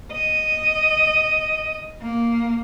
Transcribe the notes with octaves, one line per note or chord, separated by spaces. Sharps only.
D#5
A#3